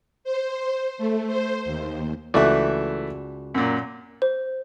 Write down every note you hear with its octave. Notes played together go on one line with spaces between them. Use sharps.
C5
A3
C5
D#2
C#2 E3 A3 F#4 D5 E5
F#2 A#2
C5